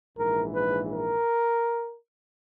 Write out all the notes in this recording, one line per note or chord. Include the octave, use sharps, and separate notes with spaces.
A#1 G#2 E3 A#4
B4
A#4